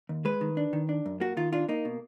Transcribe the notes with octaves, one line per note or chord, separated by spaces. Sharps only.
D#2
G#3 B4
D#3
D4
D#3
D4
F#2
A#3 F#4
D#3 F4
D4 F4
A#3 D#4
B2